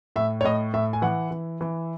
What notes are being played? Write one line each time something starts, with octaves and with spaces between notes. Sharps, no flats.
A2 E5
C#5
A2 D#5
A2 E5
G#5
E3 F#5
E3
E3